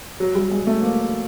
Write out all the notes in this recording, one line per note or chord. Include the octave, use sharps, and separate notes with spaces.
F#3
G3
G#3
A3
A#3